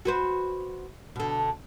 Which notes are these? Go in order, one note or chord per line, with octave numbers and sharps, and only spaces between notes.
F#4 B4 C5
B2 D3